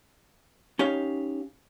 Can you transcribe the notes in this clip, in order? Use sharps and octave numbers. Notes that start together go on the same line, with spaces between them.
C#4 D#4 G4 C#5 F5